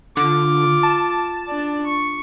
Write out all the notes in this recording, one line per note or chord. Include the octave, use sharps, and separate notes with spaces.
D3 F4 D6
A5
D4 D5
C#6